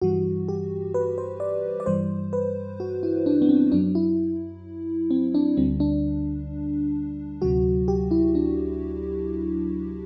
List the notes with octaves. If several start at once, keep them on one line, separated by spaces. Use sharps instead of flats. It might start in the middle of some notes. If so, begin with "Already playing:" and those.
G2 E3 G3 F#4
G4
B4
C5
D5
D5
G2 E3 G3 C5
B4
F#4
E4
D4
B3
C4
F#2 F#3 D4
E4
C4
D4
D2 D3 G3 C4
D4
D2 C3 F#3 F#4
G4
E4
D4